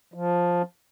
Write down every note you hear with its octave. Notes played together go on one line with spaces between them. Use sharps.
F3